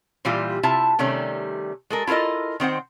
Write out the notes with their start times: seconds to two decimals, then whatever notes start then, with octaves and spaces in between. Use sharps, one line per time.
0.25 A#2 E3 G3 F4 G4
0.63 C3 E4 F4 E5 A5
0.99 C3 D#3 G3 A3 C#4
1.90 G#3 A4 A#4
2.07 E4 F4 A4 A#4 D#5
2.60 D#3 C4 C5 F#5